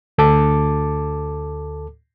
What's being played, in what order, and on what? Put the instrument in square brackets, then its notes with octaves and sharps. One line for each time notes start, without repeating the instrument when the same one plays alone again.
[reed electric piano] D2 A4 A5 D6